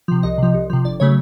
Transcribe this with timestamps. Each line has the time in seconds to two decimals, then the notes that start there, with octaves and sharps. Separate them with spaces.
0.08 C3 F3
0.23 C2 D#5
0.38 C3 F3
0.54 C2
0.70 C3 F3
0.84 G1 D5
1.00 C#3 F#3 A3 C#5